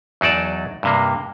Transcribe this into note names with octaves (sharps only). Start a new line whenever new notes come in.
E2 F#3 D#4 D5 A5
G2 C3 A#3